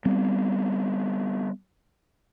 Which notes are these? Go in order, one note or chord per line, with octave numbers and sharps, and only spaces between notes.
G3 B3 C4